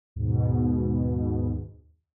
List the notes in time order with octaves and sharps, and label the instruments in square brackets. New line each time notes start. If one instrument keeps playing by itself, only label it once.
[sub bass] D#2 [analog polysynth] G#2 B2